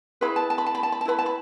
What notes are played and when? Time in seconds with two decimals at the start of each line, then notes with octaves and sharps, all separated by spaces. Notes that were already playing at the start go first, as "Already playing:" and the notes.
0.21 E4 G#4 B4 B5
0.36 A5
0.50 A5
0.58 B5
0.66 A5
0.75 B5
0.83 A5
0.92 B5
1.01 A5
1.05 E4 B4 B5
1.19 A5
1.26 B5